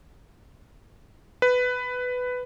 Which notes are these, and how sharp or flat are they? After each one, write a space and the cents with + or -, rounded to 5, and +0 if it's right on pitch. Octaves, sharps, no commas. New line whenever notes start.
B4 +10